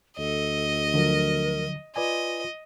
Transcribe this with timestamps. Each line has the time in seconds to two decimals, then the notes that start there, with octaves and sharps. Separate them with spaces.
0.18 D2 A4 D#5
0.94 D3 F3 F#3 A#4
1.96 F4 B4 D5 D#5 G#5